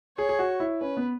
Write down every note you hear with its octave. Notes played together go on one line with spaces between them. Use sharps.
G#4 C#5
G#4
F#4
E4
C#4 B4
B3